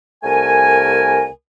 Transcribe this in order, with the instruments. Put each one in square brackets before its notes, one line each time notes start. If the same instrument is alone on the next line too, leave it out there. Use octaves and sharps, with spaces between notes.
[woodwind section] C2 A3 A#4 G#5